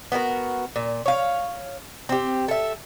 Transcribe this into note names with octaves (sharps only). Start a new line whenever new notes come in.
B3 F#4 G4 A#4
A#2
C#5 F5
C4 G4
A4 E5